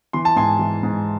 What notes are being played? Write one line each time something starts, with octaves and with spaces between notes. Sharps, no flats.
E3 C6
A5
G#2 G#5 C6
E3
G#2